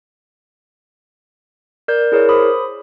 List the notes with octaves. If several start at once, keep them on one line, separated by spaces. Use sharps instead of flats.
A#4 D5 G6 G#6
E4 G#4 A#4 C#5
C5 B5 D6 D#6